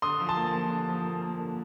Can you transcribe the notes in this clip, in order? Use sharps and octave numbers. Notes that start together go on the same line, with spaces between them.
D3 C6 D#6
F3
A5 C6
A#3
F3
D3
F3
A#3
A#3
D3